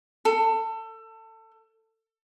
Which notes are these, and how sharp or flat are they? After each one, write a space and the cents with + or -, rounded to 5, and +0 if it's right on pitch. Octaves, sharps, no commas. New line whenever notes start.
A4 +25